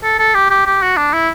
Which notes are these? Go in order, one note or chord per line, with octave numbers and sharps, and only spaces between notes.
A4
A4
G4
G4
G4
F#4
D4
E4